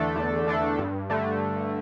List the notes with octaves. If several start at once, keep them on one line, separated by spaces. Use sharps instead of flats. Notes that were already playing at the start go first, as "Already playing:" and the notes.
Already playing: E2 D3 A3 D4 A4
E2
D3 A3 D4 A4
G2
D3 A3